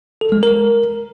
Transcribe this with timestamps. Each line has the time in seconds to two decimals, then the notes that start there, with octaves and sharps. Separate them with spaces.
0.21 A4
0.32 G#3
0.43 A#4